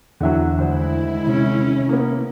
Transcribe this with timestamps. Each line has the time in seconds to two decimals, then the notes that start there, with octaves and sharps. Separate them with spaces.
0.21 E2 D3 E3 F#3 E5
0.58 D2 D#3 G#3 E4 C5
1.27 C3 C#4
1.89 A#3 B3